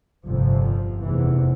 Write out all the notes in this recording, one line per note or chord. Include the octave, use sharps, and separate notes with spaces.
G1 F2 C3 F3
F1 E2 C3 E3